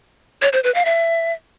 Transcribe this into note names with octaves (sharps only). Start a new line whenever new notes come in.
C#5
C5
B4
F5
E5